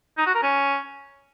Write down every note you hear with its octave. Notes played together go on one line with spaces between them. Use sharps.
D#4
F#4
A#4
C#4